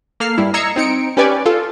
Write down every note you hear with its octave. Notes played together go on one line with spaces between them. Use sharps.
A#3 A4 F6 C7
G2 G3 E4
D#5 A#5 E6 G#6 C7 C#7
C4 D#4 C#7 D7
C#4 G4 B4 D5 G#5
F4 A4